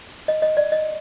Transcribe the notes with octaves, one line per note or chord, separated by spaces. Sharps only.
D#5
D#5
D5
D#5